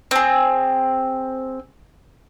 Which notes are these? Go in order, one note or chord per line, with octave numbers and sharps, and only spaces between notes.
C4 G#4